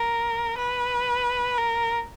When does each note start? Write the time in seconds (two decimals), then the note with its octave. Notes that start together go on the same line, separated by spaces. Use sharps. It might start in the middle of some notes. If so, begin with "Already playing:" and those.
Already playing: A#4
0.58 B4
1.58 A#4